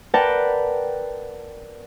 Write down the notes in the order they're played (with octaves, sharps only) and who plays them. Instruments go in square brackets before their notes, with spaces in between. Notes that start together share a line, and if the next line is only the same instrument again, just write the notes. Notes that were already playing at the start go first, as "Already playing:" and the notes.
[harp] A#4 B4 D5 F#5 G5 A5